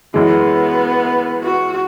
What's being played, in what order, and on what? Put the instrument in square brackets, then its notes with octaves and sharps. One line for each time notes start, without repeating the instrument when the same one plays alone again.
[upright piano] F#2 E3 G#3 [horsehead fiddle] B3
[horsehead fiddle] F#4